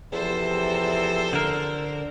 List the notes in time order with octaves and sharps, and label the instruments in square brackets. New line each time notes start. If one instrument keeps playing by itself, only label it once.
[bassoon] E2 [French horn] C3 [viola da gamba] F3 A4 C5
[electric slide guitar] D3 A#4